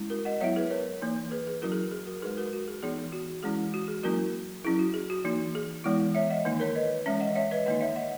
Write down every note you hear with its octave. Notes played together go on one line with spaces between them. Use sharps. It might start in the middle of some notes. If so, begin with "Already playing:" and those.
Already playing: G#3 C#4 E4
F#4 A#4
D#5 F#5
F#3 B3 E4 C#5 E5
G#4 B4
A#4 C#5
E3 A#3 D#4
G#4 B4
G#4
F#3 C#4 E4 F#4 A#4
G#4
G#4
F#4 A#4
G#3 D#4 G#4 B4
F#4 A#4
F#4
G#4
E3 B3 D#4 G#4
G#4
F#4
E3 G#3 C#4 E4 G#4
G#4
F#4
G#4
F#3 A#3 C#4 E4 F#4 A#4
F#3 C#4 E4 G#4
F#4
G#4
F#4
E3 A#3 D#4
G#4
E3 G#3 B3 E4
C#5 E5
D#5 F#5
D#3 A#3 D#4
A#4 C#5
B4 D#5
E3 G#3 C#4 C#5 E5
D#5 F#5
C#5 E5
B4 D#5
D#3 A#3 D#4 D#5 F#5
C#5 E5
D#5 F#5